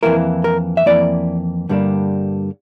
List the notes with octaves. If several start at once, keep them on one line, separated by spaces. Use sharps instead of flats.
F2 E3 A#3 E4 A#4
A#4
E5
F2 E3 A#3 E4 D5
G2 D3 G3 A#3 D4